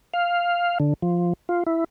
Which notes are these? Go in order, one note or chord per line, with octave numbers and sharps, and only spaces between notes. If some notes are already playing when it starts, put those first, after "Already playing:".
F5
D3
F3
F4
E4